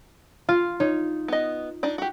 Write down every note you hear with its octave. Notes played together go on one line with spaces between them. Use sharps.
F4 F5
D#4 C#5
B3 D#5
D4 D#4 D5
F#4 G4